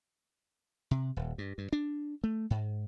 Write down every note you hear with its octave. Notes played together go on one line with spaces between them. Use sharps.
C3
D#1
G2
G2
D4
A3
G#2